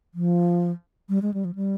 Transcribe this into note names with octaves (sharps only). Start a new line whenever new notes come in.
F3
G3
G#3
G3
F3
G3